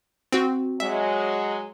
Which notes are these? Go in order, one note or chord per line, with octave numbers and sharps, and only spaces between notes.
C4 F#4
F#3 G#3 E5